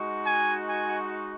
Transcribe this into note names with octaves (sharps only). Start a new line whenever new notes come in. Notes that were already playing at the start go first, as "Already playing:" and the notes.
Already playing: G#3 D#4 F#4
G#5
G#5